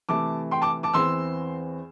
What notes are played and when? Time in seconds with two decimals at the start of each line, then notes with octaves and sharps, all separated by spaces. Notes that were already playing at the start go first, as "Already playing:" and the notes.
0.09 C3 E3 A3 A5 D6
0.51 G5 C6
0.62 A5 D6
0.83 A5 D6
0.93 E2 E3 C4 C6 E6